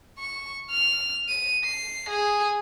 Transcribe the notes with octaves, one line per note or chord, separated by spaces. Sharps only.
C#6
F6
D#7
C7
G#4